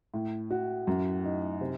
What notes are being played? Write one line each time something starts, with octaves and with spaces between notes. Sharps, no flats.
A2
F#4
F#2
D#4
C3